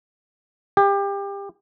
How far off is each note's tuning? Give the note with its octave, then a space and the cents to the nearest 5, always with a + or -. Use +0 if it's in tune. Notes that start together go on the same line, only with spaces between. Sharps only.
G4 +25